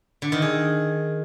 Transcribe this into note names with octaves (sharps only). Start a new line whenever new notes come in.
D3
D#3
G#4